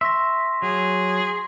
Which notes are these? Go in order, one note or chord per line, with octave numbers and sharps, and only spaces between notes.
E5 C6 C#6 A#6
F#3 G#4